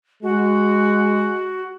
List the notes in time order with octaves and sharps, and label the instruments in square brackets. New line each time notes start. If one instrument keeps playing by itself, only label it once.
[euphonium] G#3 [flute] F#4